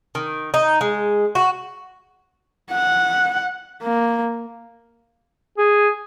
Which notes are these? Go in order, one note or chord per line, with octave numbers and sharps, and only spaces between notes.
D#3
D#4
G#3
F#4
F#5
A#3
G#4